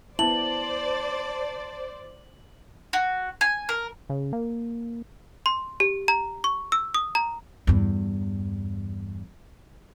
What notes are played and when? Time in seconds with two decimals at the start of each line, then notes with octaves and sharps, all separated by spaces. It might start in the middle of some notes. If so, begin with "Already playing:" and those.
0.19 B3 E4 C5 D5 A5 F#7
2.93 F#4
3.41 G#5
3.69 A#4
4.10 C#3
4.33 A#3
5.46 C6
5.80 G4
6.08 A#5
6.44 C#6
6.72 E6
6.94 D#6
7.15 A#5
7.67 E2 G2